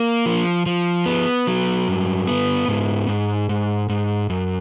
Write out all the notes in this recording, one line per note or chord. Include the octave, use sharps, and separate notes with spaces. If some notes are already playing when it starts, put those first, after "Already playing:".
Already playing: A#3
F3
F3
B3
F#3
G2
B3
G#2
G#2
G#2
G#2
F#2